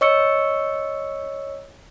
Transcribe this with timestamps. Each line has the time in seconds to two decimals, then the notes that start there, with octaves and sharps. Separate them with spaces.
0.01 C#5 D#5 C#6 E6 C#7